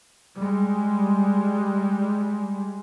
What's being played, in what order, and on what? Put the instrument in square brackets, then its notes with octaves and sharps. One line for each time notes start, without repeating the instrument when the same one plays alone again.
[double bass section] G3 G#3